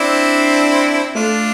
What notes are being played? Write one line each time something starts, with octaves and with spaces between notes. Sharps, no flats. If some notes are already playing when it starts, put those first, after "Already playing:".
Already playing: C4 D4 E4
A3 D4 F4